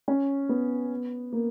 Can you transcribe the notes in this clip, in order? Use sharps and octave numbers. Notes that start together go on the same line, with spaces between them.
C#4
B3
A#3